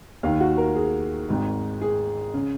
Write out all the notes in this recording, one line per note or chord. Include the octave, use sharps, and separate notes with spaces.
D#2 D#3 F5
F#4
A#4
G#4
G#1 G#2 D#3
G#4
C#3